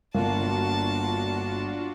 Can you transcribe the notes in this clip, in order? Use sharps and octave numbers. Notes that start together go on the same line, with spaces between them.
G1 A#3 D4 F4 F#4 A5